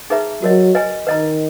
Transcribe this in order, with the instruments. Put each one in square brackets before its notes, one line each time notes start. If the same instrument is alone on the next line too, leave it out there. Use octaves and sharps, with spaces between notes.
[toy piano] D#4 G#4 B4 E5 A#5
[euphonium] F#3 [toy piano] F#4 A#4 D#5
[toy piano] B4 D#5 G#5
[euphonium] D#3 [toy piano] B4 D#5 A#5